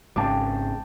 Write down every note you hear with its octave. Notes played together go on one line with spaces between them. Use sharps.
G#1 G#2 C#3 G5 A5 D6